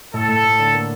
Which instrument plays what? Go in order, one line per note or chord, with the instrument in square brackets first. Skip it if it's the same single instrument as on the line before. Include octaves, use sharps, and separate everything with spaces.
[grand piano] A2 [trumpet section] A4
[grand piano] A2
A2
D3
A#3